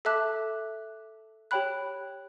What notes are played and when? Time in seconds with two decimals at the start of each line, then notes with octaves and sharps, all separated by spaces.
0.05 A4 E5 A5 D6 F#6
1.51 G4 C#5 G5 B5 F#6